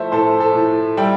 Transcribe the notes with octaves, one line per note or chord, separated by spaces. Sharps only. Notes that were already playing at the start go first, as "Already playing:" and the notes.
Already playing: F3 A3 A4 C5 E5
A2 A4 C5
A4
A2
G3 E5 G5